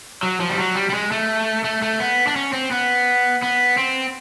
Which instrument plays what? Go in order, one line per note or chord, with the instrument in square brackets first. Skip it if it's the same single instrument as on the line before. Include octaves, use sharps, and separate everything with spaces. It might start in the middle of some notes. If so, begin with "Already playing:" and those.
[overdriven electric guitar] F#3
F3
G3
F#3
G3
G3
G#3
A3
A3
A3
B3
D4
C#4
C4
B3
B3
C4